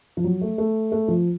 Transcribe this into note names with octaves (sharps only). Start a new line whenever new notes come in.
F3
F#3
A3
A3
A3
F3